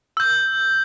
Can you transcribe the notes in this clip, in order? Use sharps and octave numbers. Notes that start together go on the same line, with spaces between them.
E6 G6